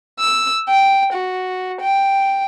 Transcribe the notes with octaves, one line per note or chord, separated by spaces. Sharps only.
E6
G5
F#4
G5